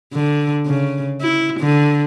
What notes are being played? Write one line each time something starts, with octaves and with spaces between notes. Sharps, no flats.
D3
C#3
E4
D3